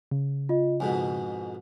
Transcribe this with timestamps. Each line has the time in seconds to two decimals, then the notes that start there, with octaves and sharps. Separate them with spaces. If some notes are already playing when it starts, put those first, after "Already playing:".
0.11 C#3
0.49 F4 D#5
0.80 F2 G#2 B2 G#5